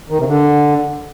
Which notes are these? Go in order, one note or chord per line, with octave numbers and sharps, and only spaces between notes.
D#3
C3
D3